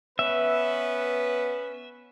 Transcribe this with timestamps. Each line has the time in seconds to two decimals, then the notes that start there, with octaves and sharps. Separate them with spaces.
0.19 B3 C#4 B4 E5